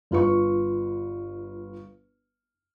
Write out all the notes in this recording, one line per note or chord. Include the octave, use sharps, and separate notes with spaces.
G1 F4 B4 C#6